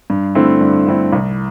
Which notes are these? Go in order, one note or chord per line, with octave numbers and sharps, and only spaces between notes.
G2
D3 A3 C4 E4
G2
D3 A3 C4 E4
C2